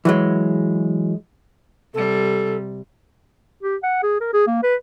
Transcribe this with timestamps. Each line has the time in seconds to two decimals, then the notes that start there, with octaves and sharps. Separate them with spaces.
0.05 E3 F#3 G#3
1.94 C3 G3 A4
3.63 G4
3.83 F#5
4.03 G#4
4.20 A#4
4.34 G#4
4.47 A#3
4.63 B4